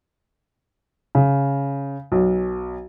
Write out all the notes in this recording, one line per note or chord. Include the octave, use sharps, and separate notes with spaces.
C#3
B1